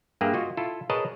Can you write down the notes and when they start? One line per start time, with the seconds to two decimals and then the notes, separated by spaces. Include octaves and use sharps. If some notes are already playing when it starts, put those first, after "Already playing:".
0.21 G2 A#3 G4 G#4 E5
0.34 F4 F#4 D#5
0.57 E4 F4 A4
0.90 G#4 A#4 B4 C#5 D#5 A5